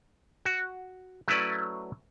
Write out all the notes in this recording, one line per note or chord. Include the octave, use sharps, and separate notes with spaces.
F#4
F#3 A3 C#4 E4 B4 D5